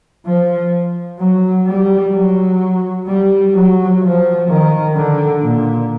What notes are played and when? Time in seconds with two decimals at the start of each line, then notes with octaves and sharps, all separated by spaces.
0.25 F3
1.19 F#3
1.67 G3
2.14 F#3
3.07 G3
3.54 F#3
4.02 F3
4.48 D#3
4.95 D3
5.42 A#2